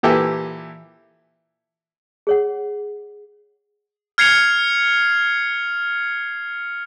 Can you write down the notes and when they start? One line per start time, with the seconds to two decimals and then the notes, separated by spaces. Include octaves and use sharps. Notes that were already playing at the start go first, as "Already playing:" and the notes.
0.03 A#2 E3 G4 A4 E5
2.27 G#4 C#5 F#5
4.18 F6 G#6 C7 C#7 F7